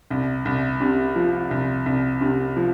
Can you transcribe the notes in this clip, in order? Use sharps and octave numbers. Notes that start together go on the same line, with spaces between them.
C2
C2
C3
F3
C2
C2
C3
F3